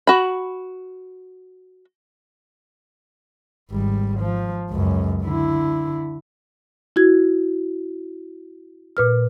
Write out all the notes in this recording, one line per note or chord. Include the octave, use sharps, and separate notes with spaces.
F#4 B5
G#1 G3
F3
C#2 F#2
D3 E4
E4 F#4 G#6
A#2 B4 F6